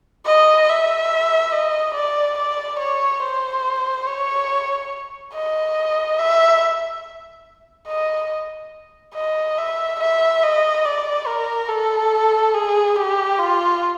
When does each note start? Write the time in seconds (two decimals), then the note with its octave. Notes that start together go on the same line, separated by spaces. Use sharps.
0.26 D#5
0.69 E5
1.52 D#5
1.95 D5
2.38 D5
2.80 C#5
3.22 C5
4.07 C#5
5.34 D#5
6.19 E5
7.88 D#5
9.15 D#5
9.58 E5
10.00 E5
10.43 D#5
10.85 D5
11.27 A#4
11.69 A4
12.55 G#4
12.97 G4
13.39 F4